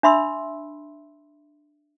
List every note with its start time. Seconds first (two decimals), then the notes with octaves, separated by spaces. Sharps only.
0.03 D4 E5 B5 C6 E6